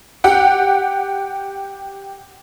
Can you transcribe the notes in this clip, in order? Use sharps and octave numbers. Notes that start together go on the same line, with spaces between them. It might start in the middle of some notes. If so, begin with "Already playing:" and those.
G4 F#5